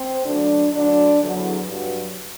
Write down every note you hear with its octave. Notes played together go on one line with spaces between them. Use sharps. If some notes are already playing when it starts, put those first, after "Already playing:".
Already playing: C4
D2 D3 F#3 D4
D2 D3 F#3 D4
E2 D3 F#3
G2 F#3